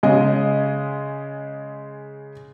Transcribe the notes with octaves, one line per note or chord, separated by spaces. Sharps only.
C#3 G#3 D#5